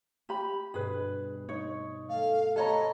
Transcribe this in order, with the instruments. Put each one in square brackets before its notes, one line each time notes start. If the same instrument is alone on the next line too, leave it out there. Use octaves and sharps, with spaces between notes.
[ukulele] G4 B5
[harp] G2 B2 [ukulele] G#4 B4
[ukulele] D#4 C#5
[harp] A3 [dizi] F5
[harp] B3 B4 [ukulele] A4 C#5 A#5 [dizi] D#5